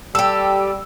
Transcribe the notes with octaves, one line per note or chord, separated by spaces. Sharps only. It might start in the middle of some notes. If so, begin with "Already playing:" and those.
G3 G4 A4 E6